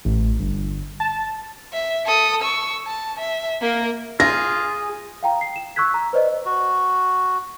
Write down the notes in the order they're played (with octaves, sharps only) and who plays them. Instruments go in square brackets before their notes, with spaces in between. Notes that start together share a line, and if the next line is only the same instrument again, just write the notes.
[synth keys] A1
G1
A5
[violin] E5
A4 D#6
C#6 E6
A5
E5
A#3 A#4
[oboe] F4 [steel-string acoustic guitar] G#4 [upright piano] A#6
[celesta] F5 G5 A#5
C7
E7
C#6 E6 F#6 G#6 B6
A#5
B4 C5 D5 D#5
[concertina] F#4